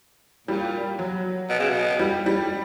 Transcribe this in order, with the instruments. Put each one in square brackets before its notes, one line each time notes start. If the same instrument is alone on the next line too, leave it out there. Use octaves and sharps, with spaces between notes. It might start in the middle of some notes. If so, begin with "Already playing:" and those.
[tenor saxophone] A#2 [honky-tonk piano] G3
[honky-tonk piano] F#3
[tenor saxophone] B2
C#3
B2
[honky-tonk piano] G3
G3